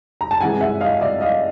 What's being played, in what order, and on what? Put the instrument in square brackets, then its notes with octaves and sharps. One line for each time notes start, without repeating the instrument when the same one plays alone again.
[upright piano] A#5
A5
C3 E3 G#3 F#5 G#5
E5 F#5
D#5 F5
D5 E5
D#5 F5